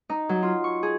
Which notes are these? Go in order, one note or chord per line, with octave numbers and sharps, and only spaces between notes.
D#4
F#3
F4
C#6
G#4